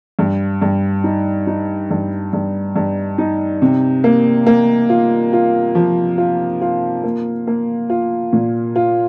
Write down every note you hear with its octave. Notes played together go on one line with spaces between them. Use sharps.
G2
G2
D#4
D#4
G2
G2
G2
D#4
C3
A#3
A#3
F4
F4
F3
F4
F4
A#3
A#3
F4
A#2
F4